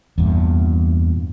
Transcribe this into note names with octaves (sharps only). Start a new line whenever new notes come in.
E2 G2 A#2